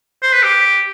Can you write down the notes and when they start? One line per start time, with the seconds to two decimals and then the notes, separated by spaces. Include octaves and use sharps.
0.23 C5
0.33 B4
0.43 G4